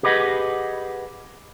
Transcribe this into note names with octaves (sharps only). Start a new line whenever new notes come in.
G4 G#4 B4 D#5 F#5